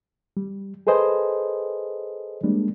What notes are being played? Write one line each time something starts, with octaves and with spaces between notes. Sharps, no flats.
G3
G#4 A4 B4 C5 D#5 G#5
G3 G#3 A#3 D4